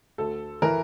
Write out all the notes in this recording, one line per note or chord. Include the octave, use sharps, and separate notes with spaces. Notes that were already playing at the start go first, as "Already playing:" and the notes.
D2 A4
E3 A#4